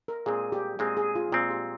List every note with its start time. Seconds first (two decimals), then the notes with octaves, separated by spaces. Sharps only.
0.08 A#4
0.26 A#2 G#3 C4 G#4
0.52 G4
0.79 A#2 G#3 C4 G#4
0.97 G#4
1.15 F4
1.32 A#2 G#3 C4 F4
1.51 G4